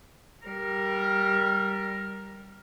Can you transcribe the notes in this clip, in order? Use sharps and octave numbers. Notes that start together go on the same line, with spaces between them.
G3 A#4